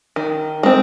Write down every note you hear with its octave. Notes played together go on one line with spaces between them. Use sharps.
D#3
G#3 C4